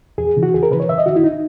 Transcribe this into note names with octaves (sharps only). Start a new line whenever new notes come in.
E2 G#4
C#3 E3
F#4
E2 G#4
A#4
C#3 E3 B4
C#5
F#2 E5
D#5
D#3 F#4
E4
D#4